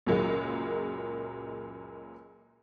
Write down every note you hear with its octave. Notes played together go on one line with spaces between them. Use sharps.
C#2 F#2 A#2 F#3 G#3 A#3